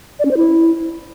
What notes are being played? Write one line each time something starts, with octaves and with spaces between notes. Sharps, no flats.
D5
C#4
C5
E4